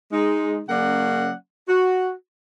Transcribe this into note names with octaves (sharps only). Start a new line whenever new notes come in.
G#3 D#4
C#3 F#3 A#3 C#4 D5 F#5
F#4